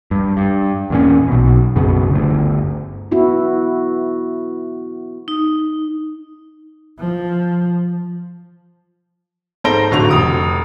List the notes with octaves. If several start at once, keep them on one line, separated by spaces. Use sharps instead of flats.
G2
G2
E2 A#2 C#4
B1 B2
B1 F#2 C#3 B3
G1 D2
B3 E4 F#4
D#4
F3
G#2 A4 C5 A#6 D7 G7
D1 D3 C#6 F7
F1 D#6 D7